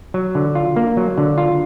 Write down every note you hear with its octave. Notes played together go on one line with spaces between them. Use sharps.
F#3
D3
F4
A#3
F#3
D3
F4